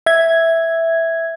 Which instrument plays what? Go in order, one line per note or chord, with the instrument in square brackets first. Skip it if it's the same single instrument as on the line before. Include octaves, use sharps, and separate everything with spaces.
[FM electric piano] E5 G#6